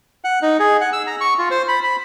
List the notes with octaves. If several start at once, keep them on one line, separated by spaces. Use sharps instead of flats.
F#5
D#4
G#4
F#5
E6
A#5
C#6
F4
C5
B5
B5